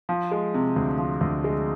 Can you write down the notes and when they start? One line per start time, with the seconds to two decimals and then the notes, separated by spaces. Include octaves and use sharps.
0.09 F3
0.31 G#3
0.54 C3
0.76 D2
0.98 F3
1.21 D2
1.44 G#3